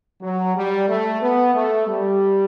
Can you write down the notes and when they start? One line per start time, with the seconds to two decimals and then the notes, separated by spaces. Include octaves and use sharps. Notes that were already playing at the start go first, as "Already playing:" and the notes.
0.22 F#3
0.55 G3
0.89 A3
1.21 B3
1.54 A3
1.87 G3